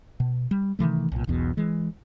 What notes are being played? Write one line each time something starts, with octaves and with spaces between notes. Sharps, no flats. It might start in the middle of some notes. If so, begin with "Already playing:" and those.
B2
G3
C3 D#3 E3 A3
B1 A#2
E1 B1 E2 B2
E3 G#3